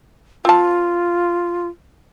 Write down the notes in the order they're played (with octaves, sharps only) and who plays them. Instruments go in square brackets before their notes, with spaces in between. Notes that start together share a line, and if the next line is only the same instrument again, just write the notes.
[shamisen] C4 A5 [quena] F4